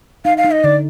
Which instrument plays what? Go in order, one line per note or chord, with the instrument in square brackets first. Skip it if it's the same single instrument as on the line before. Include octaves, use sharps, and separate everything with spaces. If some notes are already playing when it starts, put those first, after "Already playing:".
[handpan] D#4 [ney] F5
[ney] F5
[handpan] D#4
[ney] D#5
[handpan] D3 [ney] D5